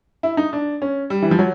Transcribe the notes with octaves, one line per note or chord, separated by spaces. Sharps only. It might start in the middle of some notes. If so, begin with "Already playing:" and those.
E4
D#4
D4
C#4
G3
E3
F3
F#3